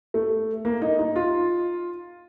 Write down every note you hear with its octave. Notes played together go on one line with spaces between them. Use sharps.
A3
A#3
D#4
D#4
F4